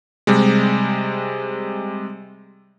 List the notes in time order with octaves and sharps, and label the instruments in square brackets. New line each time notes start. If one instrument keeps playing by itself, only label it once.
[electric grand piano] C3 G3 G#3